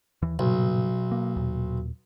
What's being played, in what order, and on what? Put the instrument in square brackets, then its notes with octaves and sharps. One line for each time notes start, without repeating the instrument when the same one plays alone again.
[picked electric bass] D#2 E3
[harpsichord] B1 [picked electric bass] G2 A#2 C#3
[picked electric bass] A#3
D#2 A#2